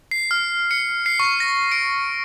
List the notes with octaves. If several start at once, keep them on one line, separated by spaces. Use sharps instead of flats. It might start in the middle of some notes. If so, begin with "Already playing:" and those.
C7
F6
C#7
C7
C#6
A#6
D7